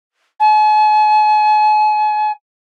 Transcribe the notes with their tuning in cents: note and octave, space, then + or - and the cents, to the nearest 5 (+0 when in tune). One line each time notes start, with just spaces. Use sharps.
G#5 +45